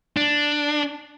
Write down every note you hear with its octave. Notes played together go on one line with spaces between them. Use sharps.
D4